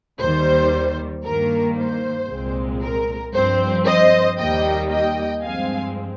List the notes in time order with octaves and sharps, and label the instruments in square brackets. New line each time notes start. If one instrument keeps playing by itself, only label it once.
[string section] D#2 D#3 G3 C5
G2 D#3 A#3 A#4
C5
C2 A#2 G#3 C4
A#4
G2 F3 C4 C5
C5 D#5
D#2 D#3 G3 A#3 D#5 G5
D#5 G5
G2 F3 G#3 C4 F5 G#5